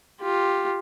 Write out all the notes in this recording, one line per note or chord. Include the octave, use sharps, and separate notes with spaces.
F4 G4